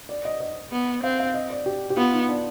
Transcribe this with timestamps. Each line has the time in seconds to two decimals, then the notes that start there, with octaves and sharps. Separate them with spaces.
0.09 D5
0.25 D#5
0.40 D#5
0.72 B3
1.03 C4 F5
1.20 F5
1.34 D#5
1.50 D5
1.66 G4
1.90 G4
1.97 B3 F4
2.13 D#4
2.29 D4